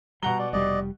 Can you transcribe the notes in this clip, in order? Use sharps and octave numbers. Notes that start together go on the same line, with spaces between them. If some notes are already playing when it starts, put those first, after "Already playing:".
B2 G3 F#5 A#5 G7
D5
F1 G3 D5 D#5